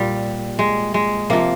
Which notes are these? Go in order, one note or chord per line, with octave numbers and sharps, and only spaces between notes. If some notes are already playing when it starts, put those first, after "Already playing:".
Already playing: A#2 G3
G#3
G#3
C3 F3 A#3